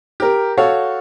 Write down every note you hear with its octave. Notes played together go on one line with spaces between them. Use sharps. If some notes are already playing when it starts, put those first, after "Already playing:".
G4 A#4
F#4 A4 C#5 F5